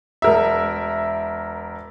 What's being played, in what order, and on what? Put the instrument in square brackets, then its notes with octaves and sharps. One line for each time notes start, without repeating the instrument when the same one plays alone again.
[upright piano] E1 A#4 E5